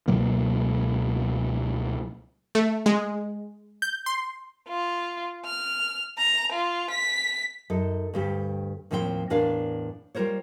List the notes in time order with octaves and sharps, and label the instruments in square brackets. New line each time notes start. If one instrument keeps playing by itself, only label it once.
[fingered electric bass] C#2 B2 F#3 A#3
[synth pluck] A3
G#3
G6
C6
[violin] F4
F6
A#5
F4
B6
[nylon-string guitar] F#2 D#4 A4
D2 G2 G4
D#2 A2 F3 C4 F#4 G5
E2 A2 D4 A#4 D5 F5
G3 F4 F#4 A#4 C5 C#5